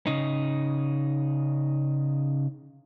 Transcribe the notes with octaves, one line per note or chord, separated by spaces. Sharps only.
C#3 D#4